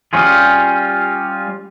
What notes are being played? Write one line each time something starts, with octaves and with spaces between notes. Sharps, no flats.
G3 C#4 F4 G#4